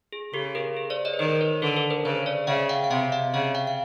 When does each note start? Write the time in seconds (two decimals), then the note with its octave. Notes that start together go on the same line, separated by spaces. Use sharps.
0.12 G#4
0.33 C#3 G4 A4
0.55 G#4 A#4
0.77 G#4
0.90 C5 D5
1.05 C#5 D#5
1.13 B4
1.19 D#3 A#4 C5
1.41 B4 C#5
1.62 D3 A4 B4
1.76 A4 B4
1.90 A#4 C5
2.05 C#3 B4 C#5
2.26 C5 D5
2.47 C#3 E5 F#5
2.69 F5 G5
2.84 F5
2.91 C3 E5 F#5
3.12 D#5 F5
3.34 C#3 E5 F#5
3.54 F5 G5
3.67 F5